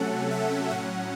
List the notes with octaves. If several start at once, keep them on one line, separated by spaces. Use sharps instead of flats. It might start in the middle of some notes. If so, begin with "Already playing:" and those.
Already playing: C3 F#3 A3 C#4 A4 F#5
E5
A2 F#3 C#4 F#5